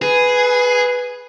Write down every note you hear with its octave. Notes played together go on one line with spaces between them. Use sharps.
G#4 B4